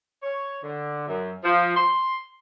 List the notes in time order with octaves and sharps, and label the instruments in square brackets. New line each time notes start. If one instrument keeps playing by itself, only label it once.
[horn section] C#5
D3
F#2
F3
C6